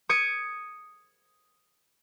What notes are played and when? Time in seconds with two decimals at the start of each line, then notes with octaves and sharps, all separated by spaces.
0.09 D#6 G#6 C#7 D7